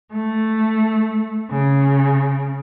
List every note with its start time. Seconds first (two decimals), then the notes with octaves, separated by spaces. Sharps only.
0.10 A3
1.49 C#3